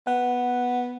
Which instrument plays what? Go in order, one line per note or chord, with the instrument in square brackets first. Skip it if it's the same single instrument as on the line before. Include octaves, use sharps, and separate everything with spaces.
[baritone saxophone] B3 [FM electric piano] F#5